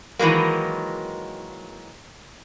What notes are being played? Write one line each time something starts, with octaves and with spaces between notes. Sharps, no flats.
D#3 E3 F#3 G#3 A#3